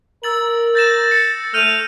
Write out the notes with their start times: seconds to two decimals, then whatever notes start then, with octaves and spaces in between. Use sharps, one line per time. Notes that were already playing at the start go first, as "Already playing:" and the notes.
0.24 A#4 E6 A6 F#7
0.75 G6 A6 A#6 E7
1.11 C#7
1.54 A3 F6 G6 D#7 F7